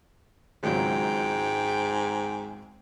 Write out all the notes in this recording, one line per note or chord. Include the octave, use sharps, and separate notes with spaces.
G#1 C#2 G#2 F#3 G5